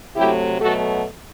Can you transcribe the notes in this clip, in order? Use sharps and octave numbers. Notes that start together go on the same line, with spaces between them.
C3 F#3 A3 E4 G4
B2 F#3 A3 F#4 A4